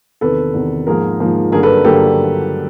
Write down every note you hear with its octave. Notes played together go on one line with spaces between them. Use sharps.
E2 C3 D#3 A4 B4
E2 C3 D#3
G#2 F3 A#3 G#4 A#4
G#2 F3 A#3
G2 D3 F#3 A#3 G#4 A#4
A4 B4
G2 D3 F#3 A#3 G4 A4